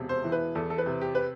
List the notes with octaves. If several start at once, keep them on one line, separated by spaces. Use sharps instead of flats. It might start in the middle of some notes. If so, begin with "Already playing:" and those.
Already playing: E1 C3
C5
E3
B4
E2 A4
A4
B4
C3
G4
B4